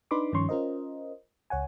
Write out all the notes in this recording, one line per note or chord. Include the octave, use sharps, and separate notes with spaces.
D4 D#4 B4 B5 C6 D6
G2 D#3 F3 C#4 C6 C#6
C#4 F4 A#4 C5 D#5
C#2 C#5 F#5 G#5